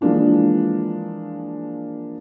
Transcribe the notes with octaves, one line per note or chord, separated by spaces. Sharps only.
E3 F3 G#3 A#3 D4 F4